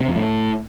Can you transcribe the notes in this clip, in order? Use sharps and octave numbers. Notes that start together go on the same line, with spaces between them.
C3
F2
A2